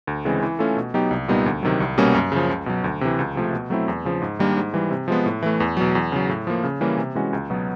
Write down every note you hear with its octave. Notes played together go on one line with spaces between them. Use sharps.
D2
C#3 E3 G#3 C4
E3
A3 C#4 F4 A4
B2
F#3 B3 D#4 G4
C2
A#2 G3 B3 D#4
D2
C3 D#3 F#3
C2
B2 G3 A#3 C#4
F#2
C#3 F3
C#2
B2 F#3
D2
C3 E3
C#2
C3 F3 A3
B2
F#3 A3 C4 E4
E2
C#3 F3
G#2
D#3 G3 A#3 D4
G#2
E3 G3
C3
F3 G#3 B3
A2
E3 A3
E2
B2 F#3
E2
C#3 F#3
A2
F3 A#3
C#3
E3 G3 A#3 C#4
C3
E3 G#3 C#4 F#4
C#2
B2 F#3 B3